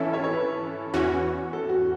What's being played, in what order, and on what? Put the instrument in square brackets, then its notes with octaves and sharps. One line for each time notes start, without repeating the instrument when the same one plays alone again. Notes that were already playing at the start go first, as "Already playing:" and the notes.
Already playing: [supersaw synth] E3 C#4 E4 A4 [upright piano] E5 A5
[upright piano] C#5
C#5
B4
[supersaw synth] E2 E3 C#4 F#4
[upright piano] A4
F#4